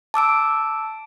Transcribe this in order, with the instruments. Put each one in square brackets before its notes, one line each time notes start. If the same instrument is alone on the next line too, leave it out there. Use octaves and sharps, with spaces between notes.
[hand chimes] A5 D6 E6 D7